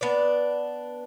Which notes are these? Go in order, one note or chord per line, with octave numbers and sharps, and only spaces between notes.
B3 D4 D5